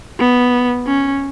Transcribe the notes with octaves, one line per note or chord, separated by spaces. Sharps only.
B3
C#4